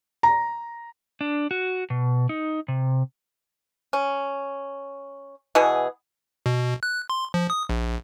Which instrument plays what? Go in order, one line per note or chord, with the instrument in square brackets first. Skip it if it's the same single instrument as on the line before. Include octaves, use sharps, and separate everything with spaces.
[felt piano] A#5
[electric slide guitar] D4
F#4
B2
D#4
C3
[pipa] C#4
B2 E3 B3 G#4
[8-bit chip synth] B2
F#6
C6
F3
D#6
A#1